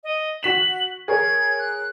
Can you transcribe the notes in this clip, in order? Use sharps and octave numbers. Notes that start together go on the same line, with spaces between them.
D#5
F#4 B6 E7 F#7
G#4 A#4 C#5 G#6
F#6